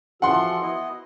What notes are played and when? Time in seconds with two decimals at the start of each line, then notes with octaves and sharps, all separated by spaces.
0.22 E3 F3 F#4 A4 F#5 C6
0.62 B3 E4 D#5